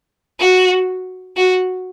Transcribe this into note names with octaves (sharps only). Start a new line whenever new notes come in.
F#4
F#4